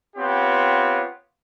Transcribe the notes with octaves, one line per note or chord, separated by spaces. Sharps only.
B3 C4 F4 G4 C#5